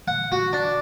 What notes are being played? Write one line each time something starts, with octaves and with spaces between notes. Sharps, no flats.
F#5
F#4
D4